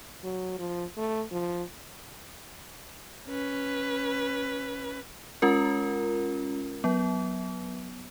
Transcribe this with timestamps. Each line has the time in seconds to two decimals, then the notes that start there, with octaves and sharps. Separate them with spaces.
0.23 F#3
0.59 F3
0.97 A3
1.32 F3
3.28 C#4 B4
5.42 G#3 C#4 F4 A#4
6.84 F#3 B3